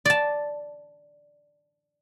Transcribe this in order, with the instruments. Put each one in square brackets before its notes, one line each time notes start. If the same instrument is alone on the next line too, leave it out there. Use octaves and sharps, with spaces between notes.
[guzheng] D5 A5